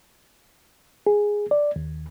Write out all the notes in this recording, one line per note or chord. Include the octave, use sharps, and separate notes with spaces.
G#4
D5
D#2